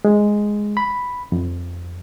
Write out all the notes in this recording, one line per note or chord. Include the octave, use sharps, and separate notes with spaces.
G#3
B5
F2